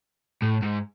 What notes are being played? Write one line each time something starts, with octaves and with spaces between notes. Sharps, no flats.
A2
G#2